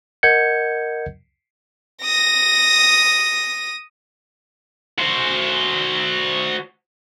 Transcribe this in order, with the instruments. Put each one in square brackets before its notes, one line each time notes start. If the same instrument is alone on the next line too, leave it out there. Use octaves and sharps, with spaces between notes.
[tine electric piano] A#4 D#5 F#5 G6 G#6 C#7
[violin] D#6 A#6
[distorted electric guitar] F#4 C5